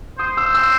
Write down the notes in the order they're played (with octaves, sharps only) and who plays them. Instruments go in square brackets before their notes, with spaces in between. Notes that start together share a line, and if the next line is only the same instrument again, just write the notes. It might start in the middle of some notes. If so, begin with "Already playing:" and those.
[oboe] C5 [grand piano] D#6
[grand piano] E6
E6